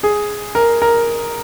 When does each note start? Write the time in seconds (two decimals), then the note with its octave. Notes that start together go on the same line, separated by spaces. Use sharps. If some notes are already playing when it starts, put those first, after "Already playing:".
0.03 G#4
0.55 A#4
0.82 A#4